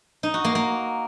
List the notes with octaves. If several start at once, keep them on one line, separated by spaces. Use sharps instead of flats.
D#4
F#4
A#3
A#3